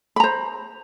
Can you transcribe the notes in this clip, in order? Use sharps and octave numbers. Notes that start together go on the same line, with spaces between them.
C5 A#5 B5